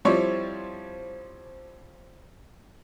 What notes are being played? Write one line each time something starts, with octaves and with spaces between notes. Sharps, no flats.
F3 G3 C4 E4 C#5 D5